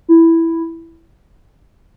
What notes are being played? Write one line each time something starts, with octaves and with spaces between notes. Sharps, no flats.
E4